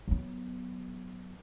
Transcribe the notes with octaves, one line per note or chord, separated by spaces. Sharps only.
F#3 B3